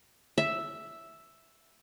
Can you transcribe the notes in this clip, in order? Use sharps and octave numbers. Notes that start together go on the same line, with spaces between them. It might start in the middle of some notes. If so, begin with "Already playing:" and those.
E5